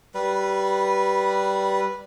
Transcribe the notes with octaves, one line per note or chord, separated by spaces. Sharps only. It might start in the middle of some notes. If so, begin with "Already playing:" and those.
G3 B4